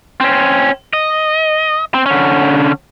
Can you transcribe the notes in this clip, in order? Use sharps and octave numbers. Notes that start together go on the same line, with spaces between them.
C4 C#4
D#5
C4
D3 C#4